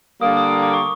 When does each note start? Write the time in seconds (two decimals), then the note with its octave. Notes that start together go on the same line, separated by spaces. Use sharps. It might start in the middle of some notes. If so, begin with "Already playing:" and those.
0.21 D3 G3 A#3 D#6
0.37 D#6
0.51 D#6
0.63 D6
0.74 C#6